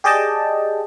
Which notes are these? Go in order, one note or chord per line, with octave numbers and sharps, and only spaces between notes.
G4 G#4 D5 D#5 G5 A5